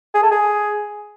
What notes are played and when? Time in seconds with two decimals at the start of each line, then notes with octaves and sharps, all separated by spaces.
0.14 G#4
0.23 A4
0.31 G#4